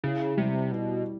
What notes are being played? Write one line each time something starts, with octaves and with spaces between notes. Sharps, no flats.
C#3 E4
C3 G3
B2 E4